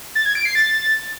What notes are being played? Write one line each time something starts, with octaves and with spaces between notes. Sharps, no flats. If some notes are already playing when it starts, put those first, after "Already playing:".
A6
G#6
D7
C7
A6